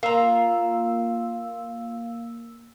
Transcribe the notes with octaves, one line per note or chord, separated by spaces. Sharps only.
A#3 F4 F5 A#5 E6